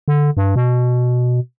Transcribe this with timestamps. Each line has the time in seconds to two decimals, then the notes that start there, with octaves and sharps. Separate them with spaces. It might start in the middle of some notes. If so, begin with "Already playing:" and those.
0.08 D3
0.37 G2
0.56 B2